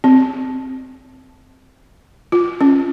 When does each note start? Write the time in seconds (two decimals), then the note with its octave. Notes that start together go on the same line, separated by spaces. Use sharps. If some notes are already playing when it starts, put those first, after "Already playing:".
0.04 C4
2.32 F4
2.61 C#4